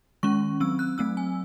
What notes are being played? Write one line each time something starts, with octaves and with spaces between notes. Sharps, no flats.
D#3 G#3 C#4 C#6
F#3 C4 E6
F#6
F#3 A3 C4 E6
G#5